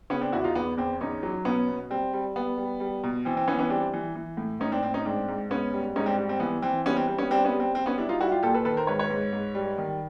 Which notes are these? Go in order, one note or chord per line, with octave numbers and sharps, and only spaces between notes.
C#3 B3 C#4
C4 D4
E2 E4 F#4
D#4 F4
E2 B3
E2 C4
E2 C#4 D#4
F#3
B2 B3 C#4
B2
G3 C4
G3
G3 B3
G3
G3
B2
E3 C4
C4
E3 B3 C#4
B3 C#4
G3 C4 D4
E3
E3
A2
A2 C#4 D#4
C4 D4
A2 C4
C#4 D#4
G#2 C4 D4
G#2
G#2 B3 C#4
G3
G#2 C#4 D#4
C4 D4
G3
C4
E3 B3
E3 C4
G3 B3 C#4
C4
G3 C4
B3 C#4
G3 C4 D4
B3 C#4
G3
C4
G3 C4
B3 C#4
G3 D4 E4
D#4 F4
G3 E4 F#4
F4 G4
A#2 G4 A4
A4 B4
D#3 A4 B4
A#4 C5
G#2 B4 C#5
B4 C#5
G#2
G#2
G3
D#3